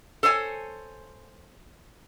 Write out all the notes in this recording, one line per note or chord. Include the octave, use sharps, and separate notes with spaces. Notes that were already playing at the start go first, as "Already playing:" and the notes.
A4 C5 C#5 G#5